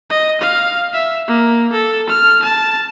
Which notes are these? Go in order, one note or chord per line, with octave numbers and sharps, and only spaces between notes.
D#5
F5
E5
A#3
A4
F6
A5